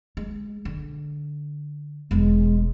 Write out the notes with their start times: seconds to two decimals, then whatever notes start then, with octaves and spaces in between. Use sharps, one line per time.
0.17 G#3
0.65 D3
2.11 E1 E3 G#3